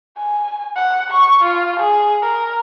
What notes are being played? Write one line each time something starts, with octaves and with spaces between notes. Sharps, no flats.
G#5
F#5
C#6
F4
G#4
A#4